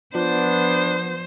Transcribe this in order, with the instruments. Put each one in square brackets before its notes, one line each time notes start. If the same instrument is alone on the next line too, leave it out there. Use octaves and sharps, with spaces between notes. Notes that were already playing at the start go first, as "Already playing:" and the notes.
[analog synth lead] F3 [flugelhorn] B3 [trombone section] D4 [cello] C5